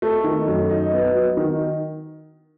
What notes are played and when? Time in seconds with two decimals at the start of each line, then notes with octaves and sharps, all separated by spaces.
0.02 A3
0.24 D#3
0.47 F#2
0.70 D#4
0.92 B3
1.15 F#3
1.37 D#3